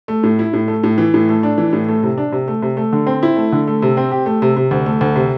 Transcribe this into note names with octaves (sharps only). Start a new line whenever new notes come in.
A3
A2
E4
A2
A3
A2
E3
A2
A3
D4
E3
A2
A3
C3
D4
C3
A3
C3
A3
D3
C4
E4
A3
D3
A3
C3
C4
G4
A3
C3
C3
D2
A3
D2
C3